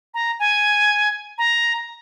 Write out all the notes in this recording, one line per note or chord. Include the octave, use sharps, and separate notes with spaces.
A#5
G#5
A#5